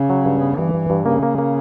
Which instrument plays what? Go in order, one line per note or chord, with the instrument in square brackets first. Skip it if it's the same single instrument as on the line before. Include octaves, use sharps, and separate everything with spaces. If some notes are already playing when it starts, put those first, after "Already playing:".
Already playing: [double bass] C#3
[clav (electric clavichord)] F#3
G2
B3
[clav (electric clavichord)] G2 [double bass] E3
[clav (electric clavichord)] G2
G2
[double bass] C#3 [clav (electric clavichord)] A#3
[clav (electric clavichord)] A#3
A#3